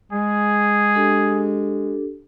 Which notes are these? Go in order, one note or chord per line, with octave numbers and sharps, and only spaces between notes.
G#3 G#4
D4 G4 A4